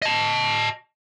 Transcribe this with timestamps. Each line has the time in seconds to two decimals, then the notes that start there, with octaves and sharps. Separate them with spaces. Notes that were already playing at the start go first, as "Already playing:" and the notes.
0.02 D#5 A5